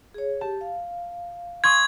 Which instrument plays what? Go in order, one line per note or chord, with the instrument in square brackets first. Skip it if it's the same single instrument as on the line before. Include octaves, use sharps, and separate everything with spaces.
[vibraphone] G#4 C#5
[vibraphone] G4 [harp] A5
[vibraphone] F5
[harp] C6 C#6 D#6 [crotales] G#6